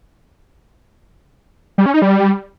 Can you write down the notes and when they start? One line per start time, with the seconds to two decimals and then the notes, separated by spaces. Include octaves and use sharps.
1.78 G3
1.86 C#4
1.94 D#4
2.02 G3